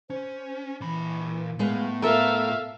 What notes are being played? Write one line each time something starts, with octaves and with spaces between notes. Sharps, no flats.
C#4 C5
A#2 E3 B5
A2 G#3 B3 B4 F5
F4 A4 A#4 E5 F5